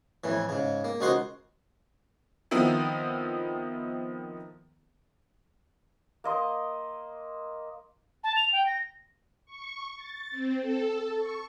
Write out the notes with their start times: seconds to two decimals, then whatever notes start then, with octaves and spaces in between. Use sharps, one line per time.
0.24 F2 A2 E3
0.49 G#2 C#3
0.84 A#3
1.01 C#2 D#4 F#4 A#4 C5 C6
2.51 D#3 F3 B3 C4 E4
6.24 A#3 D#5 C6 D#6
8.24 A5
8.36 F7
8.52 G5
8.66 A#6
9.46 C#6
9.96 A6
10.31 C4
10.61 A4
11.16 C#6